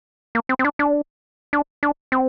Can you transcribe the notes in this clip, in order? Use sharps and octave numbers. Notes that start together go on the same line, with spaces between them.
A#3
C4
C4
D4
D4
D4
D4
C4